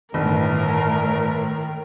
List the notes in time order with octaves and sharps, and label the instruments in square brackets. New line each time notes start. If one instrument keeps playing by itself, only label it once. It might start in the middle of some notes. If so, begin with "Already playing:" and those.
[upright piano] G1 [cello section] A2 [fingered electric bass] D#3 [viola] A#4